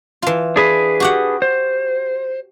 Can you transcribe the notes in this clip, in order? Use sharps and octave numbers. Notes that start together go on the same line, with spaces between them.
E3 F4
D4 G#4 B4
F#4 G4 F#5
C5